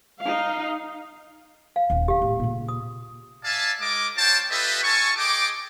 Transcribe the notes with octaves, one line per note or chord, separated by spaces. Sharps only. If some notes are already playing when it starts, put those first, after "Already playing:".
D#4 F5
F5
D#1 C4
G4 F5
A2
A#2 C#3
D#6
D5 E5 F5 G#5 A5
G#3 A#4 D#5 D6
F4 C5 C#5 G5 A5
F4 G4 A4 B4 D#5 E5
F4 A4 G#5 A5 C#6
G#4 D#5 G5 D6